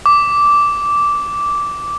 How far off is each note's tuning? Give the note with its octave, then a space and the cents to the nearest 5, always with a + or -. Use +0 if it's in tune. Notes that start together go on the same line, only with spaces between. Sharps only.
D6 -10